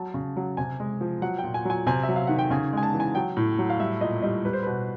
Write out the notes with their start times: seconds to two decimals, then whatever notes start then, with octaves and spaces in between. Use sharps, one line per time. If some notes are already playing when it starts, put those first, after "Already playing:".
Already playing: F#3 A5
0.14 C#3
0.37 F#3
0.57 C3 G#5
0.80 G#3
1.01 F3
1.22 F#3 F#5
1.38 A#2 G5
1.54 G#5
1.65 F#3 G#5
1.87 C3 G#5
2.03 E5
2.09 F#3
2.16 F5
2.27 D#3 F#5
2.38 G5
2.51 C#3 G#5
2.73 G#3 G#5
2.83 A5
2.94 E3
3.00 G#5
3.15 F#3 G5
3.37 A2
3.59 F#3
3.70 F5
3.80 G3 E5
4.01 A#2 D#5
4.22 G3 D#5
4.45 G3 B4
4.53 C5
4.63 B2 B4